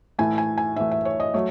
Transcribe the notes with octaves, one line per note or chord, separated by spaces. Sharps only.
A2 E3 A3 G#5
G#5
G#5
A2 E3 A3 E5
E5
C#5
D#5
F#3 A3 C#5